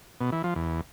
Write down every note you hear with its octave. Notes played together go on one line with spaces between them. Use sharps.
B2
E3
F3
E2